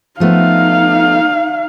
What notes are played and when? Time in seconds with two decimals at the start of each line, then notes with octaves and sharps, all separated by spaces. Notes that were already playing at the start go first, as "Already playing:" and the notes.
0.20 F3 A3 B3 D#4 F5